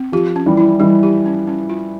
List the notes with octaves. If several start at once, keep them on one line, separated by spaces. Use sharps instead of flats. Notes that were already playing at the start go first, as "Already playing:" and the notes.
Already playing: C4
F3 G4
C#4
E3 G3
E4
E3 G3
G4
C#4
C#4
F4